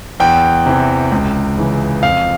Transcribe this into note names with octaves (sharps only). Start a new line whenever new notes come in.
E2 G5
C3 E3
C#2
C#3 E3
F2 F5